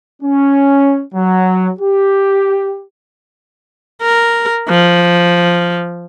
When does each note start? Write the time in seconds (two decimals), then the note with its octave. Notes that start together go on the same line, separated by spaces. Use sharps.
0.22 C#4
1.15 F#3
1.79 G4
4.02 A#4
4.69 F3